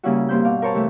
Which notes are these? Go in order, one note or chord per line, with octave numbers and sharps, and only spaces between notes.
C#3 G3 A#3 C#4 E4 F#4
G2 A#3 C4 C5 B5 G6
B2 F5 D6
A#4 C5 C#5 A5
C3 E3 A3 C4